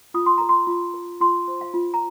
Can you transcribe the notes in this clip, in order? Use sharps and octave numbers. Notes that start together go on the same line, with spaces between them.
F4 D#6
C6
A#4 A#5
C6
F4
A#4
F4 C6
C5
F5
F4
A#5